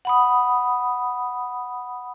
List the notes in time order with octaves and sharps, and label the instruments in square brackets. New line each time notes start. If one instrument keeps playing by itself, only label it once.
[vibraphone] F#5 B5 D#6